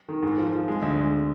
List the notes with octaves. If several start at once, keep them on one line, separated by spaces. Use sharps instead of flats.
D#3
G#2
F3
F3
G#3
D2
G#3